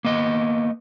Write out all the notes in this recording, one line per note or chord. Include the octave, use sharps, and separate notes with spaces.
A#3 B3 D#5